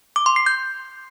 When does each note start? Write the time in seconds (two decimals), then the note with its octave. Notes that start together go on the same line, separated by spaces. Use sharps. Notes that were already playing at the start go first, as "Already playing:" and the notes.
0.16 D6
0.26 C6
0.36 C7
0.46 G6